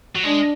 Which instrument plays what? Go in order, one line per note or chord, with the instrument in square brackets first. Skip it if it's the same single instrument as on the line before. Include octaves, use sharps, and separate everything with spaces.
[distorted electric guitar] F#3
[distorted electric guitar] G#3 [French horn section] D4